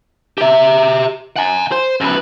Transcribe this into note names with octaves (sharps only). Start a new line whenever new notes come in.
G4 E5
F#5 G#5
C5
F#2 B4